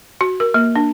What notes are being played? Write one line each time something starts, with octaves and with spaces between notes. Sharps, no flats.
F#4
A#4
A#3
D4